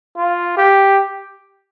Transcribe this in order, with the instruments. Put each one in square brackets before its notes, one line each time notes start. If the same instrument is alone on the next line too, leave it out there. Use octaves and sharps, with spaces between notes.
[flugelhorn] F4
G4